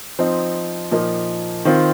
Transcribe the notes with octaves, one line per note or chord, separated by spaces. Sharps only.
F3 C4 D#4
A#2 F3 A#3 D#4
D#3 C4 F4